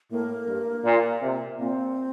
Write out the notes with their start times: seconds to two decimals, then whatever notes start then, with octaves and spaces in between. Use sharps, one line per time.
0.11 A2 A#3
0.48 G2
0.85 A#2
1.21 C3
1.58 A#2 C4